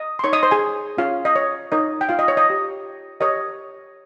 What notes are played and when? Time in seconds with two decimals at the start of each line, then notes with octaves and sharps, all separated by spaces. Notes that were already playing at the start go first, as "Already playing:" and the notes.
Already playing: D#5 D#6
0.19 C6
0.24 D#4 A#4 C#5 C#6
0.33 D#5 D#6
0.43 C5 C6
0.51 G#4 G#5
0.97 C#4 F4 G#4 C#5 F5
1.25 D#5
1.36 C#5
1.72 D#4 A#4 C#5 D#5
2.01 G5
2.09 F4 F5
2.19 D#5
2.28 C#5
2.37 D#5
2.46 G4 C#5
3.20 G4 A#4 C#5 D#5